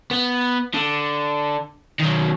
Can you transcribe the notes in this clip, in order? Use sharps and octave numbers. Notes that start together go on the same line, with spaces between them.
B3
D3
D#3 F#3